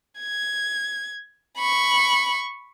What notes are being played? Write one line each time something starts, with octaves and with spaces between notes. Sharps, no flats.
G#6
B5 C#6